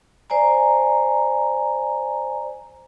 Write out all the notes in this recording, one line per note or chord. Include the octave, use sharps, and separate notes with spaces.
C5 D5 G#5 A#5